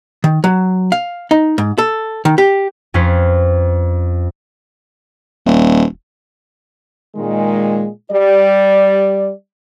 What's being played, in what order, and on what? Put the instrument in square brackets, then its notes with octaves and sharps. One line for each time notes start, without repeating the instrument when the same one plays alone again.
[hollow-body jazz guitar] D#3
F#3
F5
D#4
G#2
A4
D#3
G4
[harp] F2 C#4 F4 B4 C5
[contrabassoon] D#1
[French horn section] A#2 D#3 G#3
G3 D5